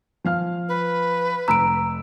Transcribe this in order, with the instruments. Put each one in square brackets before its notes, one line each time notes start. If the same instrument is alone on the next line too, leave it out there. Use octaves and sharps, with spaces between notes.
[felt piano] F3 F5 F6
[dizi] B4
[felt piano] F1 E6 [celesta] A#5 D7